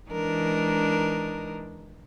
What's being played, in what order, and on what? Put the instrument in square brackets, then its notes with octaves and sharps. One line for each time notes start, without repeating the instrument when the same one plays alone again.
[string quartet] E3 G#3 D4 D#4 A#4